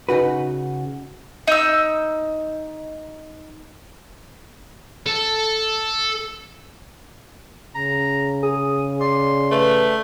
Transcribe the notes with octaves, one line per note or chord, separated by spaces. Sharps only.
C#3 D#4 F#4 B4
D#4 E6
A4
C#3 A#5
G#4 D#6
D5 C6
A3 B4